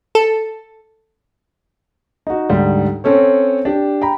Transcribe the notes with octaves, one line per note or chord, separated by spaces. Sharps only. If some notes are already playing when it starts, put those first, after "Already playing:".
A4
D#4 F#4
D2 G#2 G3
C4 C#4 A4 C#5
D4 G4
G5 A#5 B5